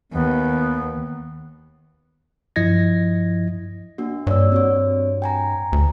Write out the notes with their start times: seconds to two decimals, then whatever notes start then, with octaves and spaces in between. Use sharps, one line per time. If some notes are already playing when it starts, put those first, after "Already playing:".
0.12 D#2 B3
2.56 G2 F3 E4 D#5 G#6 A#6
3.98 A#3 D4 F#4
4.27 G2 C#5 D5 E6
4.52 C4 F#4 C#5
5.22 G5 G#5 A#5
5.72 D2